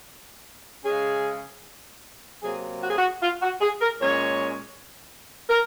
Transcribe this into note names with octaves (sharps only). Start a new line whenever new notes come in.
C#3 G#3 C#4 G#4
C3 F#3 A#3 G#4
F#4
G#4
F#4
F4
F#4
G#4
A#4
A#2 G#3 C#4 C#5
A#4